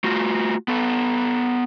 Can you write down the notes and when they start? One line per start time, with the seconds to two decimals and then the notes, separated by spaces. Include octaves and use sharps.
0.04 A3 F4 F#4
0.68 B3 A4